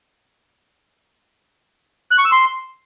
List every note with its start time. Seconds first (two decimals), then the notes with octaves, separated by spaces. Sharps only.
2.11 F#6
2.18 C#6
2.25 E6
2.32 C6